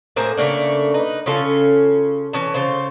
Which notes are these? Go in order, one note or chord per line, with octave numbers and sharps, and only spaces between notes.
A2 A#3 C4 G#4
C#3 A3 A#3 D4
D#4 B4
C#3 C#4 F4 A4
E3 C#4 A5
C#3 F4 C5